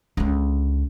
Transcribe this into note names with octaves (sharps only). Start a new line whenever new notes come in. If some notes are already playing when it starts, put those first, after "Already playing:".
C#2 D3